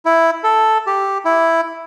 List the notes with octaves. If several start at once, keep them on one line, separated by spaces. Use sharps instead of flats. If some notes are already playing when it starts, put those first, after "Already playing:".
E4
A4
G4
E4